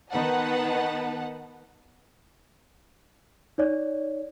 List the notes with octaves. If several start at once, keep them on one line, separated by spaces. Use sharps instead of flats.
D#3 B3 D#4 B4 F#5 A5
D#4 C#5 D5